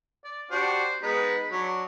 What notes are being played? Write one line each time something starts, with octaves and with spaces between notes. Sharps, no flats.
D5
D4 F#4 G4 C5
G#3 B3 D#4 B5
F#3 D4